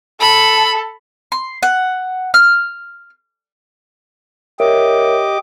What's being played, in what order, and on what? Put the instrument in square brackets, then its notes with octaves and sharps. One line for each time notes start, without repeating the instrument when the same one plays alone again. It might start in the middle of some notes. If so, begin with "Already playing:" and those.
[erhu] A4 [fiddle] B5
[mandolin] C6
F#5
F6
[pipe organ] G4 D#5 D6 [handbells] A#4 C#5 E5